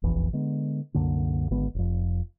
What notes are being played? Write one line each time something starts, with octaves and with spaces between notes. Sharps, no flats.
F1 A#1 E2 E3
D3 G#3 B3
C2 F#2 D3 A#3
G#1 D3 G#3 B3
F1 F2